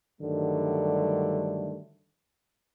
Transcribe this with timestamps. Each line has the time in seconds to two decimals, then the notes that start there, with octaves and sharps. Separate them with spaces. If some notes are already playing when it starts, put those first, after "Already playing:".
0.22 G2 D3 D#3 F#3 G3 A3